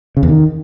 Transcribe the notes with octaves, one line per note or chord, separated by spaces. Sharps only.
C#3
E2
D#3